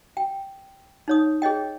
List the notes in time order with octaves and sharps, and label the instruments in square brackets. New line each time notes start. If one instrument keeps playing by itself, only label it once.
[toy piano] G5
D#4 C#5 D#6
G#4 C#5 D#5 G5